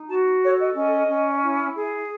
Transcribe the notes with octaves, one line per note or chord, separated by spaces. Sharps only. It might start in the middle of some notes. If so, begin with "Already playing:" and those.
Already playing: D#4
F#4 A5
A4 C#5
D#5
C#4 D#5
C#4
E4
G#4